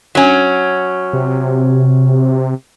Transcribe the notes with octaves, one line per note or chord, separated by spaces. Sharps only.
F#3 C#4
C3